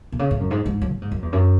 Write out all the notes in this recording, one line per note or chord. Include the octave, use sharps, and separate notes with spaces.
B2
C#3
A2
F#2
G#2
G#2
F#3
A2
G#2
F#2
E2
F#2